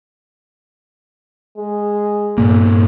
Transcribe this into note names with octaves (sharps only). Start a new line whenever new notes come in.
G#3
G2 A#2 A#3